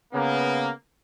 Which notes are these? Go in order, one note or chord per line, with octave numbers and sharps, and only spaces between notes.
C#3 A#3 B3